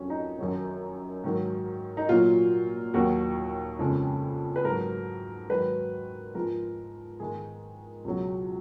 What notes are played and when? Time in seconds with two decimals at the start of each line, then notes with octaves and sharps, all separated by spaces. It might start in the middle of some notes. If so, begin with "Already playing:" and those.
Already playing: F2 D#3 F#3 C#4
0.10 D#4
0.39 F#2 D#3 F#3
1.24 G#2 D#3 F#3
1.97 D#4
2.09 A#2 F#3 F4
2.94 D#2 D#3 F#3 F#4
3.79 F2 C#3 G#3
4.56 B4
4.64 G#2 F#3 A#4
5.50 G#2 D#3 F#3 B4
6.35 G#2 F3 G#3 A#4
7.20 G#2 D#3 G#3 G#4
8.04 C#2 B2 F#3